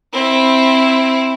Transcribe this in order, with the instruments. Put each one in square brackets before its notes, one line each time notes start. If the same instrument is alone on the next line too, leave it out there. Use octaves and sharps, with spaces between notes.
[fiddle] C4 E4